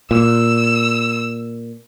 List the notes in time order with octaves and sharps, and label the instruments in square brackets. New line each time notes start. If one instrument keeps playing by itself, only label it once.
[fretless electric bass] A#2 [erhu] E6